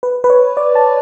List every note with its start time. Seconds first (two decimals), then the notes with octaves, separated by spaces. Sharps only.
0.03 B4
0.24 B4
0.30 C#5
0.57 D5
0.75 A5